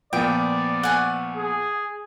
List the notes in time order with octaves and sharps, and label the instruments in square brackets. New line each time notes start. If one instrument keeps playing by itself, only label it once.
[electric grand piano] A#2 F3 B3 [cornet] D5 [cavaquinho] G5
[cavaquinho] F#5 G#5 C#6
[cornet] G#4